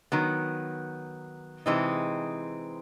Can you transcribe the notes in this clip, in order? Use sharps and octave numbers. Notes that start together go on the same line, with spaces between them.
D#3 F#3 B3
C3 E3 G#3 C4 D#4